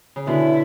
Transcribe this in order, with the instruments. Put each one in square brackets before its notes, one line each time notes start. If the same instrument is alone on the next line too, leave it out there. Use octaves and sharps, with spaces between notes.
[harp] C#3
[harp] B2 D3 [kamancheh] E4